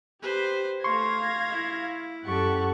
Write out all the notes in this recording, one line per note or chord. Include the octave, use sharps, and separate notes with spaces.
G4 B4 C5
A3 F5 C6 C#6 G#6 A#6
E4
F#2 G4 A4 F#5 C#6